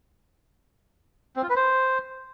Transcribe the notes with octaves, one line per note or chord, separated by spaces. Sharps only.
C4
F4
B4
C5